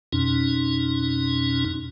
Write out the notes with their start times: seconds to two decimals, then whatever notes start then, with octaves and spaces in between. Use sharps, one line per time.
0.13 F2 B2 C#4 D#4